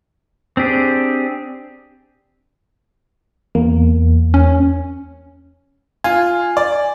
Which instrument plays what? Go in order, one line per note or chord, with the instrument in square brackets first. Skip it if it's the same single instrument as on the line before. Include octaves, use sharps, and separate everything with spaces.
[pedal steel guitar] C4 D4 G4 G#4
[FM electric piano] E2 A#3
[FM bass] C#4
[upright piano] F4 [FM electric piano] G#5
[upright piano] D5